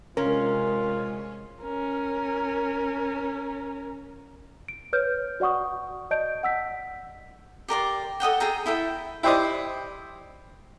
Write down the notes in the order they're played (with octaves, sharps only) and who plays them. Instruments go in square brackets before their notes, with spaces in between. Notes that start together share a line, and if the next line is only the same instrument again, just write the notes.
[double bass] C3 G#3 [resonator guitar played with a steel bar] C#4 [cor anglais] F4 [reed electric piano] A#4
[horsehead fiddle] C#4 A#4
[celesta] D7
B4 C#5 F6 G6
F#4 D5 F#5 C#6 D#6
D5 D#5 A5 G6 D7
F#5 E6 B6
[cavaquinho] G4 A#4 D5 C6
A4 D#5 F#5 G5
G#4 A4 G5 A#5
E4 A4 E5 G5
[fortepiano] E4 G4 C5 D5 D#5